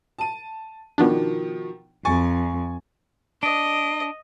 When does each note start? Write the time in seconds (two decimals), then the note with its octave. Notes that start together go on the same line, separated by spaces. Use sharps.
0.18 A5 D#7
0.98 B2 D#3 F3 B3 D4
2.05 F2 G#5 C#6 A6
3.43 D4 D#5